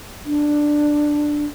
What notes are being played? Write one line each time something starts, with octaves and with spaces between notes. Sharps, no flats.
D4